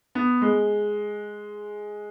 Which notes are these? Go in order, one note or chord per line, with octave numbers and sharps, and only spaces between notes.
B3
G#3